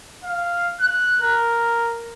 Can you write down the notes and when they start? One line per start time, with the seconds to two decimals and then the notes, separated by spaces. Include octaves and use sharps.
0.24 F5
0.81 F#6
1.21 A#4